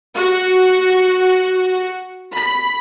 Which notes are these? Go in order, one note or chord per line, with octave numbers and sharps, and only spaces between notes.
F#4
B5